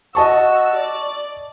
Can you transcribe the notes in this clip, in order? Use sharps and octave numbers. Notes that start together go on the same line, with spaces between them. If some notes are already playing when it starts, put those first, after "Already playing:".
F#4 D#5 A5 C#6 E6
D5